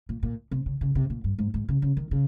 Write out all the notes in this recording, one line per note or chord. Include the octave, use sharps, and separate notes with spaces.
A#2
A#2
C3
C#3
C#3
C3
A#2
G2
G#2
G#2
C#3
C#3
D#3
C#3